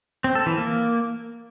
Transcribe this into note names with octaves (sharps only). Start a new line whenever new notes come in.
C4
A4
E3
A#3